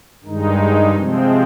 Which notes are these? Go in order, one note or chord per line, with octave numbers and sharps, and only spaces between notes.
G2 D#3 G#3 D#4
C3 F3 G#3 C4